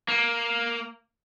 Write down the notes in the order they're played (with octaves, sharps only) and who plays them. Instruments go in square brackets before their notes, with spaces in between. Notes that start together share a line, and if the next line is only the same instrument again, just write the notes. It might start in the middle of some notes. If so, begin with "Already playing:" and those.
[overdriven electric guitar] A#3